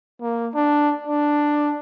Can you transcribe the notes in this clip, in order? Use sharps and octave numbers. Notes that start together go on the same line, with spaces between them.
A#3
D4
D4